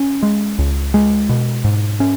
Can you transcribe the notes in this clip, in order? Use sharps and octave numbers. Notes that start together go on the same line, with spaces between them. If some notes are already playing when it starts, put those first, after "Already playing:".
Already playing: C#4
G#3
C#2
G#3
B2
G#2
C#4